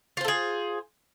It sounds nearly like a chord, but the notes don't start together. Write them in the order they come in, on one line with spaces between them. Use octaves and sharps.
F4 C5 A4 G#4